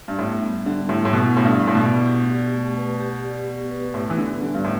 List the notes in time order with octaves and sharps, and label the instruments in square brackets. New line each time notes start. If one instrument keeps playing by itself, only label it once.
[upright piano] G2
[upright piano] A2 [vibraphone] B3
[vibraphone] G3
[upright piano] D3 [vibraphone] G3
[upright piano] A2 [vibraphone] E4
[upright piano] A2
[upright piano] B2 [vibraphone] A4
[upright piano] A2 [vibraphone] D4
[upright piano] G2
[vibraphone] D4
[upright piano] A2
B2
[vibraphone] D5
G4
D5
A3
B4
G4
D5
B3
B4
[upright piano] A2 [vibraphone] B3
[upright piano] E3
[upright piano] D3 [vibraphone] A4
[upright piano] D3 [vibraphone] G3
[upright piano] G2
A2